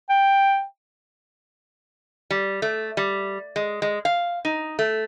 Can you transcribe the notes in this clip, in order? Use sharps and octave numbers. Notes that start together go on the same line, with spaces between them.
G5
G3
A3
G3
G#3
G#3
F5
D#4
A3